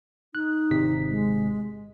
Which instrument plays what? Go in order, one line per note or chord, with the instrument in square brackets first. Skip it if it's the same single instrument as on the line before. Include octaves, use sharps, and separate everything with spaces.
[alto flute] D#4 [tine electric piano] F#6
[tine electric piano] G#1 C3 B6
[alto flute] G#3